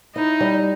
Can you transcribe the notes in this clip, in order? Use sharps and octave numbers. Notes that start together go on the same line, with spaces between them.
D#4 E4
G3